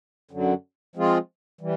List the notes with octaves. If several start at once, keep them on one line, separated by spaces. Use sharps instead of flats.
F#2 D3 F#3
F3 G#3 C4 F4 G#4
E3 G3